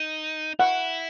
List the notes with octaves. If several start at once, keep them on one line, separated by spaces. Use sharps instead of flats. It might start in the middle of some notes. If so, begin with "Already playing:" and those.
Already playing: D#4
E4 F#5